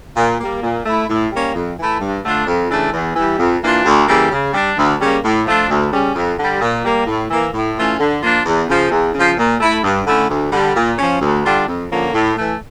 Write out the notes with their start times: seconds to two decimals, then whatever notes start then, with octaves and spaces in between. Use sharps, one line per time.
0.17 A#2
0.40 G3 A#3
0.63 A#2
0.86 A3 E4
1.09 A2
1.32 G3 A#3 C#4
1.55 F2
1.78 E3 A3 E4
2.01 G2
2.24 D3 A3 D4 F4
2.47 F2
2.71 C#3 E3 A3 D4
2.93 E2
3.15 E3 G3
3.39 F2
3.62 E3 A#3 D4 F4
3.85 D2
4.08 C#3 E3 G3 A#3
4.31 C#3
4.54 G3 D4
4.77 D2
5.00 C#3 G3 A#3 C#4
5.24 A2
5.47 F3 A3 D4 F4
5.69 D2
5.92 C#3 G3 C#4
6.15 F2
6.38 D3 G3
6.61 A#2
6.84 G3 A#3
7.07 A2
7.30 E3 A#3
7.54 A2
7.76 E3 A3 C#4 F4
7.99 D3
8.22 F3 A#3 D4 F4
8.45 E2
8.68 C#3 F3
8.91 E2
9.14 C#3 F3
9.37 A#2
9.60 A3 E4
9.84 G2
10.06 D3 A3 C#4 E4
10.30 D2
10.52 D3 G3
10.75 A#2
10.98 F3 C#4
11.21 D2
11.44 D3 G3 D4 F4
11.67 F2
11.90 D3 F3 A#3 C#4
12.13 A2
12.36 E3 A3